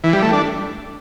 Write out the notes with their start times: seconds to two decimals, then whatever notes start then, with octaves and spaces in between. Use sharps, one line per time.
0.04 E3
0.13 G3
0.22 A3
0.33 D4